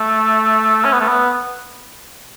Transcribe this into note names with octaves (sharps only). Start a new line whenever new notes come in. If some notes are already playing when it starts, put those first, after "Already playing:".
Already playing: A3
C#4
B3
A3
B3